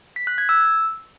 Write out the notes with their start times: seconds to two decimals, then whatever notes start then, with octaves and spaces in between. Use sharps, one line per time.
0.16 B6
0.27 F#6
0.38 G#6
0.49 E6